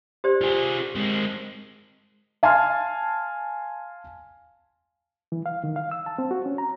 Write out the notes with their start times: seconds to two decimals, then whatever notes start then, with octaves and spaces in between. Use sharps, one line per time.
0.24 G4 C5 D5
0.42 F4 G#4
0.96 G#3 C4
2.43 F5 G#5 A5 C6 F6
5.32 E3
5.46 F5
5.64 D#3
5.76 F5
5.91 E6
6.06 A5
6.18 C4
6.31 F#4
6.46 C#4
6.58 A#5